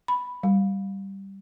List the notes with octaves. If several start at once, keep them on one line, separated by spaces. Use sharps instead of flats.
B5
G3